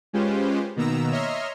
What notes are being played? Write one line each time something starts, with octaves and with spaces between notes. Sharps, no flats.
G#3 C#4 F4 G4 B4 C5
B2 D#3 A#3 B3 A#5 E6
C#5 D#5 E5 A#5 C6 F6